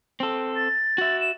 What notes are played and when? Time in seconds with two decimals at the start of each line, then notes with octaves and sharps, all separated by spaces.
0.20 C4 A4
0.56 A6
0.98 F#4 E5
1.21 E7